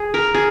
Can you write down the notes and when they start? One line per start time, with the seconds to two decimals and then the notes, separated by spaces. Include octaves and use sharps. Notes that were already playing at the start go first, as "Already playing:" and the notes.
Already playing: G#4
0.14 A#4
0.34 G#4